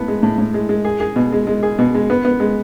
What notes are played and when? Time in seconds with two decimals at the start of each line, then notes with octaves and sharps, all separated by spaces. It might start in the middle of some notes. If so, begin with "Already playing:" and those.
Already playing: A2 B3
0.08 G#3
0.23 A2
0.38 A2
0.54 G#3
0.69 G#3
0.85 G#4
1.00 G#4
1.16 B2
1.32 G#3
1.47 G#3
1.63 G#4
1.79 B2
1.95 G#3
2.10 B3
2.25 B3
2.40 G#3